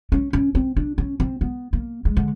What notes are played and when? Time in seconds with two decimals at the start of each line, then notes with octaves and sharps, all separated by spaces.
0.12 C#4
0.33 C#4
0.55 C4
0.77 D4
0.98 C#4
1.20 C4
1.41 B3
1.73 A#3
2.05 G#3
2.17 D3